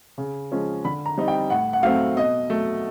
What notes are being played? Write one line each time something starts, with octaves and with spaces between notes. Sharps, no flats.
C#3
F3 G#3 C#4
D3 B5
A#5
G3 C4 D#4
G5
A2 F#5
F#5
F#3 A3 C4 F5
B2 D#5
F#3 A3